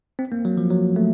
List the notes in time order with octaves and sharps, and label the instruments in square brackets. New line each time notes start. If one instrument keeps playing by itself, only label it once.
[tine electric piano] C4
A#3
F#3
F3
F#3
A3